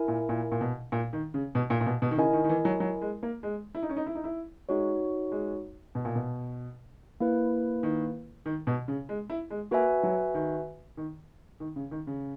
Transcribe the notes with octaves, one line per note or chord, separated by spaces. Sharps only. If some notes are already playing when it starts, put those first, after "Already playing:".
Already playing: E4 A#4 E5 G#5
A#2
A#2
A#2
B2
A#2
D#3
C#3
B2
A#2
A#2
B2
B2
D#3
C#3 E4 A#4 D#5 G#5
D#3
D#3
E3
F#3
F#3
G#3
A#3
G#3
E4
D#4
C#4
D#4
E4
D#4
E4
G#3 D#4 F#4 C#5
G#3
B2
A#2
B2
A#3 E4 B4
D#3
D#3
B2
C#3
G#3
E4
G#3
A#3 F#4 B4 E5 G#5
F#3
D#3
D#3
D#3
C#3
D#3
C#3